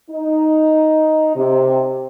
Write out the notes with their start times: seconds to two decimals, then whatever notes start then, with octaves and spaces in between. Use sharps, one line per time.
0.11 D#4
1.35 C3